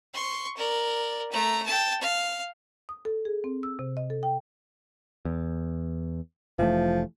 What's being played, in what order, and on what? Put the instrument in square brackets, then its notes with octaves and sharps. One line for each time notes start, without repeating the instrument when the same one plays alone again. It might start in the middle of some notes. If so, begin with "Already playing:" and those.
[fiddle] C6 C#6
A#4 D5
A3 A#5
G5 A5
F5
[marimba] D#6
A4
G#4
C4
E6
C3
D#5
A4
G5
[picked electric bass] E2
[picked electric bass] F1 E3 A3 [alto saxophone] F3